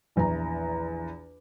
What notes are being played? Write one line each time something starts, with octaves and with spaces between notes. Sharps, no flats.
A#1 E2 E3 A#5